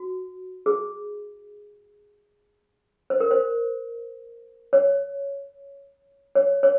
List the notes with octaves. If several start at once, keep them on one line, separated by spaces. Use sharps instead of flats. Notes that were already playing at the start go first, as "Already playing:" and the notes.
Already playing: F#4
G#4
C5
A#4
C5
C#5
C#5
C#5